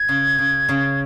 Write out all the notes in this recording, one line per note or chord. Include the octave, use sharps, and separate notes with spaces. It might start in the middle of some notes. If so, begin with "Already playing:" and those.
Already playing: G#6
C#3
C#3
C#3